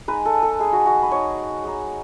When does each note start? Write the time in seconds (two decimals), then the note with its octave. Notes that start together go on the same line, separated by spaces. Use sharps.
0.08 G#3 D#4 B4
0.25 A4
0.43 A4
0.60 G#3 D#4 G#4
0.73 F#4
0.86 F#4
1.03 B4
1.11 G#3 D#4 C#5
1.64 G#3 D#4